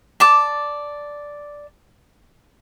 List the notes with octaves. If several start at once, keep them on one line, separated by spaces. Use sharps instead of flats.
D5 A5 D6